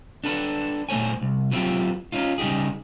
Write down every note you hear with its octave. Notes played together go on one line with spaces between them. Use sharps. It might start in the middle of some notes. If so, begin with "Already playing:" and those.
D4 A4 B4
A#2 A3 C5 C#5 G#5
C2
F#3 B3 C4 E4 F4 G4
C#4 D#4 F4
C#3 G3 D#4 G4 G#4